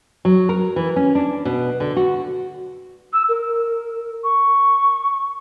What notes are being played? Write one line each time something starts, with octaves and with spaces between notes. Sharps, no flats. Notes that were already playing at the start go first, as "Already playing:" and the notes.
F#3
A#4
E3
C#4
D4
B2
D3
F#4
E6
A#4
C#6